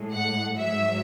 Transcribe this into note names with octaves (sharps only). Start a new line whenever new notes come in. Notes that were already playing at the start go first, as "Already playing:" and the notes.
Already playing: A2 G#3
F#5
G#2 F#3 E5